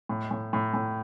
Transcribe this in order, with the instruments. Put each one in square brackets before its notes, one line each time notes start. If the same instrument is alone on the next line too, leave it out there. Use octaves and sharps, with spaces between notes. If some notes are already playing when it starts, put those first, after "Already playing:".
[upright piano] A2
A2
A2
A2